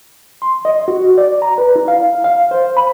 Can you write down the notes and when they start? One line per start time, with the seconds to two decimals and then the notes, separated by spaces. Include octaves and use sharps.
0.42 C6
0.65 D#5
0.88 F#4
1.18 D5
1.42 A#5
1.58 B4
1.76 E4
1.88 F5
2.24 F5
2.51 C5
2.77 B5